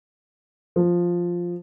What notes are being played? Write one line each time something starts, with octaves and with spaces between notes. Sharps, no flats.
F3